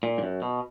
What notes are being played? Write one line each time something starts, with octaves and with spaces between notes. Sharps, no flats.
A#2
G#2
F#2
B2